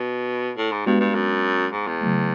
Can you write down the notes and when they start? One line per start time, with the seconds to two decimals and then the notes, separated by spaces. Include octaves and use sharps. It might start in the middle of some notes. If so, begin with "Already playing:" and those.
Already playing: B2
0.57 A2
0.72 G#2
0.86 G2 G#3 B3 D4 F#4 B4
1.00 G2
1.15 F#2
1.73 G#2
1.87 E2
2.01 C#3 F#3 A3